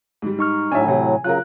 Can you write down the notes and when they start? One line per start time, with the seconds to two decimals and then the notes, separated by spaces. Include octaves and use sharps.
0.22 G#2 G3
0.39 D#4 C#6 F6
0.72 A2 F#3 D4 E5 G#5
0.86 C3 E3
1.24 C#3 F#3 F4 A#4 F#6